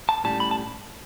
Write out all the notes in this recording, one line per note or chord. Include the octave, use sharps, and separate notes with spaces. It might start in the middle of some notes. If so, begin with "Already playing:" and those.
A5
A2 G3 C#4 A5
B5
A5